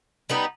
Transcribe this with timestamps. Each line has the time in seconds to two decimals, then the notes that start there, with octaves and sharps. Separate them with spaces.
0.30 G3 B3 D#4